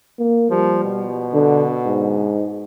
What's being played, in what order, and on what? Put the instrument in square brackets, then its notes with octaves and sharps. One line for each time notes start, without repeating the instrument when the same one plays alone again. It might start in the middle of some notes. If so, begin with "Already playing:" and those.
[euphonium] A#3
[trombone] F3 [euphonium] G3
[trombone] B2
[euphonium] D3
G#2